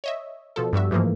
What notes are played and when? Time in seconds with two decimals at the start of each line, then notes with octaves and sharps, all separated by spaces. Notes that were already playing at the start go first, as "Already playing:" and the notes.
0.04 C#5 D#5 E5
0.56 B2 F3 A4
0.73 G2 G3 F#4 E5
0.91 G#2 E3 F3 A3 A#3